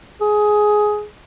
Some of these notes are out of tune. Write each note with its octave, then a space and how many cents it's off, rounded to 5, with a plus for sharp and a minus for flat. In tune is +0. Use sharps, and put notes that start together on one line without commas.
G#4 +10